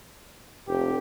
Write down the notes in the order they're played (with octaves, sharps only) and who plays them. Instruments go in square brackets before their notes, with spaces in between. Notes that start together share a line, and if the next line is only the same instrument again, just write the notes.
[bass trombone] F1 [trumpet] G4